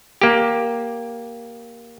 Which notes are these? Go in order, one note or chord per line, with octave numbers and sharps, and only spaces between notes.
A#3 G4